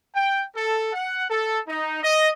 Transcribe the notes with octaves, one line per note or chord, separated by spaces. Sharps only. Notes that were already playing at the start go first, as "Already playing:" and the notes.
G5
A4
F#5
A4
D#4
D#5